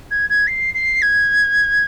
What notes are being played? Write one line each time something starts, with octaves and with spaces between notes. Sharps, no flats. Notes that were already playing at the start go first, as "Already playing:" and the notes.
G#6
G#6
C7
C7
G#6